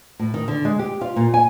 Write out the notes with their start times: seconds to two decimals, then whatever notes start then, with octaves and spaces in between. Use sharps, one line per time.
0.19 A2
0.34 D#3
0.48 D3
0.65 G#3
0.79 G4
1.01 F4
1.16 A#2
1.34 G#5